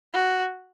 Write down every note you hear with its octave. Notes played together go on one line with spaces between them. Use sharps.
F#4